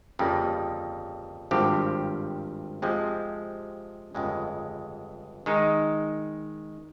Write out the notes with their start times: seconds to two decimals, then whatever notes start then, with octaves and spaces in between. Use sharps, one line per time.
0.19 G1 F2 C#3 G3 A#3
1.51 G#1 G2 F3 C4 G4
2.82 F2 C3 F3 G#3 C4
4.15 G1 F2 C#3 G#3
5.46 D#3 G#3 D#4